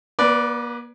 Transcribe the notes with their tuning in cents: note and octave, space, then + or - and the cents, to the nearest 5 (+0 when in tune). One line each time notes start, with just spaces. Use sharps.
A#3 +45 B4 +0 D5 -5